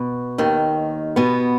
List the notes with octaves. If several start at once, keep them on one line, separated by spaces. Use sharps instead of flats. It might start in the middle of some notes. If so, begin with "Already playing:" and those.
Already playing: B2
D#2 D#3
B2 B3